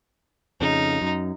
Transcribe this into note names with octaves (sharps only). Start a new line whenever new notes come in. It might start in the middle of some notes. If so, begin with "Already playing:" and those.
F2 C#3 D#4
F#2